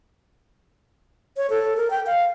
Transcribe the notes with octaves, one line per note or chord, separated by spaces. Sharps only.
C#5
A4
A#4
G5
F5